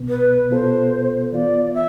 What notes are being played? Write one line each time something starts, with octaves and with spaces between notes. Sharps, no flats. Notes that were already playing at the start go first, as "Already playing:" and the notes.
Already playing: C2 B2 B3
B4
B2 B3 F4 A4 C5
E3 B3 F4 D5
F5
E5